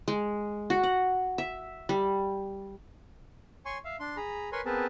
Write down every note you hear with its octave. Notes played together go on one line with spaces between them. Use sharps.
G#3
F#4
F#5
E5
G3
C#5 G#5 C6 C#6
E5 F5
D4 C6
G#4 A#5 B5
A#4 B4 C#5 G#5 B5 C6
B3 C4 G#4 A#4 B4 A5